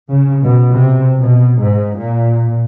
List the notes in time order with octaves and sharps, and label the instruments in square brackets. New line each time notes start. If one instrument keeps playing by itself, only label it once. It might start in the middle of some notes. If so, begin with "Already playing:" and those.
[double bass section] C#3
B2
C3
B2
G#2
A#2